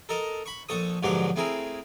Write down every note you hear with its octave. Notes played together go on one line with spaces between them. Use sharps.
A4 A#4 D#5
B5 C#6
A#1 A4 C#6 D#6
G#2 B2 D3 F3 F#3 G4
A3 C4 E4 G#4 A#4